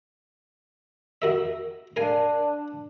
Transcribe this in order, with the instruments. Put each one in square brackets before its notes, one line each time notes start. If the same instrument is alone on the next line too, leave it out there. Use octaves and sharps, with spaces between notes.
[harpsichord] F#4 A#4 E5
[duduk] D4 [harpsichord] A#4 F5 G#5